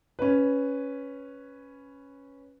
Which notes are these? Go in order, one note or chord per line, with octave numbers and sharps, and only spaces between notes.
C#4 B4